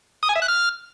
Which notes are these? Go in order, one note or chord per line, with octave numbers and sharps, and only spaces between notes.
D#6
G#5
E5
F#6
F6